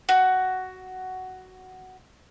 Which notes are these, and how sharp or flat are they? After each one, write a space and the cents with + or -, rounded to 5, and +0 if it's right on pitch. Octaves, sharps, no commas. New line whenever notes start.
F#4 +10